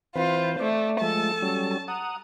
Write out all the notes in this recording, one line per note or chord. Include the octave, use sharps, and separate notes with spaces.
E3 C4 F4 B4 C5
A3 D5
F3 G#3 A3 A4 A5
F#3 G3 C#4
F#5 A#5 D#6